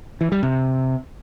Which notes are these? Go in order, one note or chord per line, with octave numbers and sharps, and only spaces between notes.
E3
G3
C3